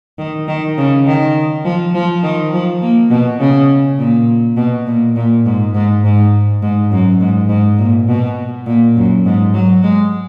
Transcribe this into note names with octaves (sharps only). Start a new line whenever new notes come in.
D#3
D#3
C#3
D#3
F3
F3
D#3
F3
A#3
B2
C#3
A#2
B2
A#2
A#2
G#2
G#2
G#2
G#2
F#2
G#2
G#2
A#2
B2
A#2
F#2
G#2
F#3
G#3